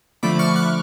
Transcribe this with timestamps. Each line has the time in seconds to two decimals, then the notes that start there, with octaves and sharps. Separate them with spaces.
0.23 D3 F3 A3 B5 D6
0.39 C#6 F6
0.56 D6 F#6